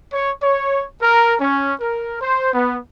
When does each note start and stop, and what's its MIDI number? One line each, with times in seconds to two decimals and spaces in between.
0.13 0.32 73
0.43 0.84 73
1.02 1.35 70
1.39 1.73 61
1.81 2.19 70
2.21 2.51 72
2.54 2.77 59